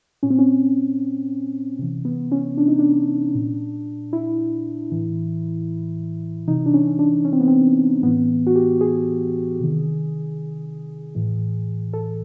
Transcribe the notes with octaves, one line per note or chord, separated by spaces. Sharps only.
A#2 C#4
C4
C#4
C3 E3
B3
C#4
D4
D#4
D4
A#2
E4
A2 E3
C3 E3 D#4
D4
C#4
D4
C#4
C4
B3
C4
A2 E3 B3
F#4
G4
G#4
C3 D#3
A2 E3
A4